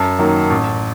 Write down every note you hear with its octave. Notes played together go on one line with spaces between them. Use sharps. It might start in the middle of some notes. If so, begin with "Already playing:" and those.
Already playing: F#2 A5
D#3 F#3 A#3
A1